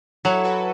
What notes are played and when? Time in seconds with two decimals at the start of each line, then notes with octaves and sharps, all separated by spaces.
0.25 F#3 E4 A4
0.45 F#4 B4